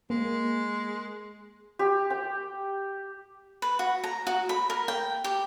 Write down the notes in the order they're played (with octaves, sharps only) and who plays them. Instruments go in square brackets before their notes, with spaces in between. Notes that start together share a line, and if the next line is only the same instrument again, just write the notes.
[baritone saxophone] G#3 [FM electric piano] A#3
[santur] G4
G5
[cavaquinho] B4
F#4
A#5
F#4
B5
A#4
G5
G4